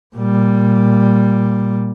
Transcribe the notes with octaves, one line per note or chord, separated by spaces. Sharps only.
A#2 G3